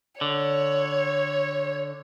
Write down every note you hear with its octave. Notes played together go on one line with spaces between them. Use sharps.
D3 C#5